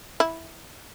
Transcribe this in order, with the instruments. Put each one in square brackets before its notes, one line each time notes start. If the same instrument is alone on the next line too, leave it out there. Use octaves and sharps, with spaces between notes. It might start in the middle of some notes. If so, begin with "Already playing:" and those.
[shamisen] E4